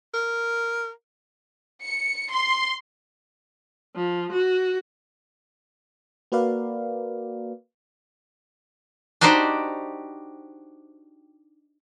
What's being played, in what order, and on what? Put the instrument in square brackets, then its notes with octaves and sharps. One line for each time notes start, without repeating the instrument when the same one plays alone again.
[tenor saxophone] A#4
[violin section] C#7
C6
[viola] F3
F#4
[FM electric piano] A#3 F#4 A#4 B4 D5 F5
[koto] D4 D#4 F#4 G4 C5 D5